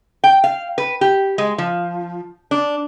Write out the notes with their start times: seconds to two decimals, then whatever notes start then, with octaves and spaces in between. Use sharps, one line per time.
0.24 G5
0.44 F5
0.78 B4
1.01 G4
1.38 G#3
1.58 F3
2.51 D4